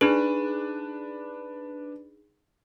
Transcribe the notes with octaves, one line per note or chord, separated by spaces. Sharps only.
D4 D#4 G#4 B4